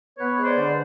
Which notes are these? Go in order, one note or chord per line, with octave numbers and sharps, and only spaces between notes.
B3 B4 C#5
G#3
C5 D5
D3